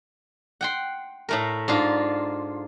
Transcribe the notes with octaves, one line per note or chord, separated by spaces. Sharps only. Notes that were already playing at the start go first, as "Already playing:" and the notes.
F#5 G5 C6
A2 A3 A#4
G#2 D4 F4